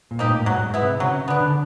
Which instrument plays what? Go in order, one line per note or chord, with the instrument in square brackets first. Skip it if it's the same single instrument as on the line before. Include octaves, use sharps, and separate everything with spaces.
[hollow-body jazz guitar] A#2
[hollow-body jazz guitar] G#2 [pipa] A#3 D#4 G4
[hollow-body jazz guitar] A2
[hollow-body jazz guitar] G#2 [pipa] F#3
[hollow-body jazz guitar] G2
G#2
[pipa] B3 E4
[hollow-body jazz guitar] C3
[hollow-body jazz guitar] C#3 [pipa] F#3
[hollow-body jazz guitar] C#3
[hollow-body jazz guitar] D3 [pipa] B3 D4
[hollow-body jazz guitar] D3